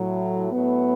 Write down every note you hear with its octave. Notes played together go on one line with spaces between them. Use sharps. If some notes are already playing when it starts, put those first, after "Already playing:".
Already playing: A2 F#3
A2 F#3 B3